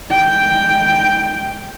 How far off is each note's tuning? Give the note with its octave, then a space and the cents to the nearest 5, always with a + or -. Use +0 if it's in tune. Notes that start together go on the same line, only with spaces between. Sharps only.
G#3 +5 G5 +0